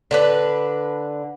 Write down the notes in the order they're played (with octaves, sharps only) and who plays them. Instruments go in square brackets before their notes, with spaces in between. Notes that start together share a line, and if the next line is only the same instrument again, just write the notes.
[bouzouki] D3 D4 B4